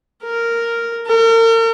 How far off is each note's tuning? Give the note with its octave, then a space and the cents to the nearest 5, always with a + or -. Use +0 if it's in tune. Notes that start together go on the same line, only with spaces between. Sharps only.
A#4 -5
A#4 -40